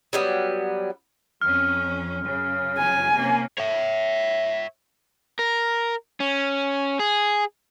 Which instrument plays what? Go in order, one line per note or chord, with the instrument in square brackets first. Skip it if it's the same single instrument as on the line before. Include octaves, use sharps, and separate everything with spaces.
[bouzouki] F#3 G3 B3
[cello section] F2 C#4 [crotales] F6
[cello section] F#2 C#3
[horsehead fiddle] G#5
[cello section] C3 A#3 C#4
[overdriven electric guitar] C#5 E5
A#4
C#4
G#4